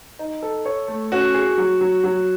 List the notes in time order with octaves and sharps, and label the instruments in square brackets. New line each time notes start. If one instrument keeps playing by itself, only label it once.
[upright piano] D#4
A4
C#5
A3
[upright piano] C#4 [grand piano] F#4
[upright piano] G#4
F#3
F#3
F#3